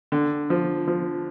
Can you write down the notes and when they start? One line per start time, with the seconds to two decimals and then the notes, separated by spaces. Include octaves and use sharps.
0.12 D3
0.50 F3
0.88 F3